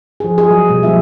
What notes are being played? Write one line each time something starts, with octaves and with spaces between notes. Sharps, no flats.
F3 G#4
G#4
F#3
B2 G3
F3 A#3 F4 E5